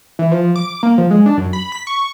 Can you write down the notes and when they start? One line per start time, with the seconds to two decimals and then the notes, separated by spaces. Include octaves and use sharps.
0.19 E3
0.31 F3
0.56 D6
0.83 A#3
0.98 F3
1.11 G#3
1.26 D4
1.37 F#2
1.53 B5
1.72 B6
1.87 C#6